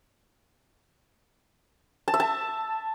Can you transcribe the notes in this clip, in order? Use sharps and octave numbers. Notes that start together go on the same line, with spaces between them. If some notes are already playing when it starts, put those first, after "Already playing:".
A5
E5
A5